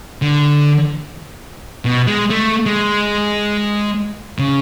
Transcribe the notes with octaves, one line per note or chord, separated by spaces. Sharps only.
D3
B2
G#3
A3
G#3
C#3